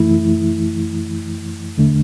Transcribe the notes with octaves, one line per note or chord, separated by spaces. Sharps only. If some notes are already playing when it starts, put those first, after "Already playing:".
Already playing: F#2 E3 A3 E4
E2 D3 A3 D4